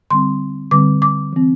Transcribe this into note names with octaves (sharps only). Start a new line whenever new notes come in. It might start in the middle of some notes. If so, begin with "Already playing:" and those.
D3 G3 C4 C6
D3 G3 C4 D6
D6
E3 C4